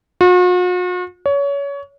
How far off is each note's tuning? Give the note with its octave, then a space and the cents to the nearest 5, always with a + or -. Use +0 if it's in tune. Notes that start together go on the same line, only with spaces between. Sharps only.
F#4 -45
C#5 +25